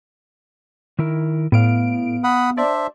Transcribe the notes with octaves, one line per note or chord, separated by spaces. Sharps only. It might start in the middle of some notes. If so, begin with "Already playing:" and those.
D#3 E4 A#4
A2 B3 F5 D7
F#5 B5 D#6
D4 C5 D5 E5